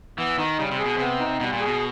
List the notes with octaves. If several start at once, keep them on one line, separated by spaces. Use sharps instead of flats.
E3 B3
D#3 D#4
C#3 G3
C3
G#4
B2
C3 B3
D#4
B2 G3
A#2
G#4
B2